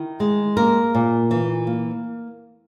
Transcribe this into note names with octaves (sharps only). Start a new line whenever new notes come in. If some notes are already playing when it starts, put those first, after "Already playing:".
Already playing: D#3 E4
G#3
A#3 A#4
A#2
E3
A#3